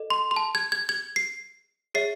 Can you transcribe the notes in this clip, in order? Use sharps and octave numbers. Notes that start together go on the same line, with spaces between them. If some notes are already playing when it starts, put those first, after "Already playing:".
Already playing: A4 D#5
C6
C6
A5
G#6
G#6
G#6
C7
G#4 C#5 E5 C7